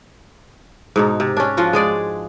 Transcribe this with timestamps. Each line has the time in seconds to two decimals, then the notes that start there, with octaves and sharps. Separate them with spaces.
0.96 G#2 B2 D#4
1.20 C3
1.37 C#4 D4
1.57 F3 F4 F#4
1.73 G#3 G#4 D5